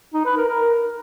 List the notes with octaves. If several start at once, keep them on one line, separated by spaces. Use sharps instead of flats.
D#4
B4
A#4
A#4